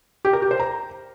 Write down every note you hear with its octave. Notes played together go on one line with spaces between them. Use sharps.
G4
A#4
G4
C5
A#5